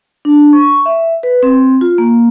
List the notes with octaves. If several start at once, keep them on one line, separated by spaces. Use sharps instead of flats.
D4
C#6
E5
B4
C4
F4
A#3